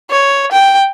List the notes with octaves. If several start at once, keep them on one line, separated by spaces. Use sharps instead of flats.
C#5
G5